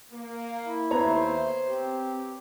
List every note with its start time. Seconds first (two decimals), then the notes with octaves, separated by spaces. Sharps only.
0.11 A#3
0.60 E4
0.91 D#2 A3 B3 C5 C#5 A#5
1.66 C4 G4